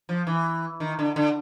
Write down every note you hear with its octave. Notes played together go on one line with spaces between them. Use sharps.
F3
E3
D#3
D3
D3